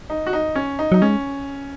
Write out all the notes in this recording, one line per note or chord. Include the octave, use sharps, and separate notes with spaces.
D#4
F#4
D#4
C#4
D#4
F#3 D#4
G#3 C#4